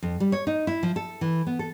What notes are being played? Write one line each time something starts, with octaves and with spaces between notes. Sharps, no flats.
F2
G3
C#5
D#4
E4
F3
A4
E3
B3
A4